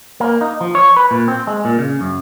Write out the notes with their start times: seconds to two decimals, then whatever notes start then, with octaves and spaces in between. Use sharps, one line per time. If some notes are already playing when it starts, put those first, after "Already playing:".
0.20 A#3
0.41 D#4
0.61 F3
0.75 C#5
0.96 B4
1.11 A#2
1.28 C4
1.47 G#3
1.65 A#2
1.79 C#3
2.01 F#2